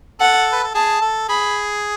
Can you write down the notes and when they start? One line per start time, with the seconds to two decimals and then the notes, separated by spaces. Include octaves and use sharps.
0.21 A4 F#5
0.52 B4
0.64 A4
0.75 G#4 A5
1.02 A4
1.29 G#4 B5